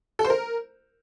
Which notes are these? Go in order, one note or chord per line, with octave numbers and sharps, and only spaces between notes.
A4
C5
A#4